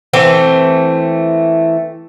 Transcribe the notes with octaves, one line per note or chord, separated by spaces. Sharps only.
E3 A3 C4